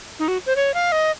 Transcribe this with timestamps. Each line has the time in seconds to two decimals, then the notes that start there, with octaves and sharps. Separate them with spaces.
0.19 D#4
0.28 F#4
0.46 C5
0.56 C#5
0.74 F5
0.92 D#5